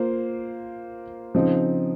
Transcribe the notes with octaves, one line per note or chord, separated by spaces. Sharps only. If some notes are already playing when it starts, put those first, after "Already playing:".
Already playing: A#3 F4 C5
C#3 F3 C4 D#4